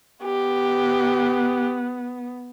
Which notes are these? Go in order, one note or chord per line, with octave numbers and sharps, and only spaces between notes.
B3 G4